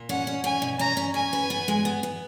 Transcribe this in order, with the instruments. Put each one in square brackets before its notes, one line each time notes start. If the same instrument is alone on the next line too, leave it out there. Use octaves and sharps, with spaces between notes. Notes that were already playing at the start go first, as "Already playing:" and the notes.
Already playing: [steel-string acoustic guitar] A#2
[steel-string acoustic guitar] C#4 [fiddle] F#5
[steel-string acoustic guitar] C#4
[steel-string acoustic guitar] C#4 [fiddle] G#5
[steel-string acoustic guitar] B2
[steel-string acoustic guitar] C#4 [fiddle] A#5
[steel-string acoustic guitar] C#4
[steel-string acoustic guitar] C#4 [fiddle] G#5
[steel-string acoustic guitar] B4
B3
G#3
B3
B3